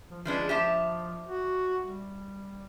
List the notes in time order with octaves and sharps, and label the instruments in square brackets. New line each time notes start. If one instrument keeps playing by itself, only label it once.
[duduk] F3
[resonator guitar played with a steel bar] F3 G#3 D4 [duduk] B4
[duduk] F3 [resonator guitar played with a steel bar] G4 E5 A5
[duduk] F#4
G3